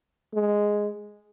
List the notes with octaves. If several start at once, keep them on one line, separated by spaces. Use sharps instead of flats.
G#3